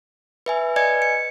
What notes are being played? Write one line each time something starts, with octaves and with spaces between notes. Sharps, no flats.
B4 E5 G#5
B4 D5 D#5 G#5 G#6 C#7
C#7